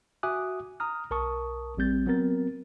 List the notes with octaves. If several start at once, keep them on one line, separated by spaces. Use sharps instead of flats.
F#4 E5 G#5 D6 D#6 F#6
A#5 D#6 F6
B1 A#4 A5 C#6 D#6
A1 G3 C4 G6 A6
F#3 B3 C4 A#4 A6